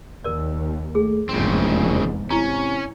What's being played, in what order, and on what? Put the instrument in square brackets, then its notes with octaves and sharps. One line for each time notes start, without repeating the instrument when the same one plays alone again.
[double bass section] D#2 [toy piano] A#4 D5
[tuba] A3 [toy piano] G#4
[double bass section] F1 E2 G#2 [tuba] A#1 [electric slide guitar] C#3 C4
[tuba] C3 [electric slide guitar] C#4 [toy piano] E4 A#5